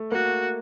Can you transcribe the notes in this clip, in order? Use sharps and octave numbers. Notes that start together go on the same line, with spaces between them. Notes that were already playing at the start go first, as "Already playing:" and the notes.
Already playing: A3
A#3 F#4